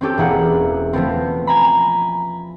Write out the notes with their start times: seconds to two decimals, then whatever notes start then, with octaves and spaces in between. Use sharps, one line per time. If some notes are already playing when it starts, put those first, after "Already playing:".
0.01 C4 C#4 G4 A4
0.18 E1 A#3 E4 G#4 F#5
0.93 F3 A3 B3 C4
1.47 G#5 A#5 B5